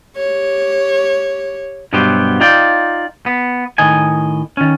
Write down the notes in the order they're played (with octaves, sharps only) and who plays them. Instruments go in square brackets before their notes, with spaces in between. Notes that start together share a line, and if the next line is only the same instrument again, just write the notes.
[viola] G4 C#5
[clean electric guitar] G2 B2 F#3 B3 C4 G4
D#4 F4 D5 G5
B3
A2 D#3 D#5 G#5
D#3 C#4